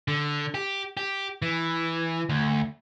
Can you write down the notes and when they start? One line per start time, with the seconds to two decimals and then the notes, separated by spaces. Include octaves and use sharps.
0.08 D3
0.54 G4
0.97 G4
1.42 E3
2.29 D2